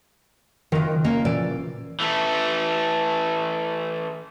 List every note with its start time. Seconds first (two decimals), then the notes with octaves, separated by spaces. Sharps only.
0.72 F#1 D#3 F4 A#4 D#5
1.04 A#3 C#4 D#5
1.25 A#2 E3 D5
2.00 E3 A3